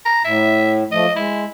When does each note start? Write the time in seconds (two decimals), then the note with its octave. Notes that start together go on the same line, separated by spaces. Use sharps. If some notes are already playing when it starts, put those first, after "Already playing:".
0.05 A#5
0.24 A2 E5
0.92 F3 A3 D#5
1.16 G#3 E4